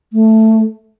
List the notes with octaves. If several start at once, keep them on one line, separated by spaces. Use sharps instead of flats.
A3